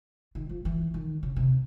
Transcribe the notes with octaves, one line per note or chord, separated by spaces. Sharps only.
D#3
F3
E3
D#3
C#3
C3